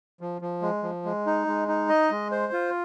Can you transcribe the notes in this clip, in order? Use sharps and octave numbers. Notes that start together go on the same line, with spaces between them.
F3
F3
G#3
F3
G#3
D#4
G#3
D#4
D#5
G#3
C5
F4